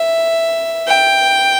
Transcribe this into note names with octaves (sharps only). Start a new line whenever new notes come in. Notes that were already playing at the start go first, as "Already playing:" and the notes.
Already playing: E5
G5